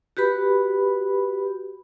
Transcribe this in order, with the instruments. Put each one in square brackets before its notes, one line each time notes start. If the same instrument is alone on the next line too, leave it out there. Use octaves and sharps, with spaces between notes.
[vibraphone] F#4 G4 B4 B5